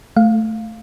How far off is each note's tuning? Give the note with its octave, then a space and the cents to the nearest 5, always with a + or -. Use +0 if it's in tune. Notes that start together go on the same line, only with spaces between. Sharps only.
A3 +0 F5 +0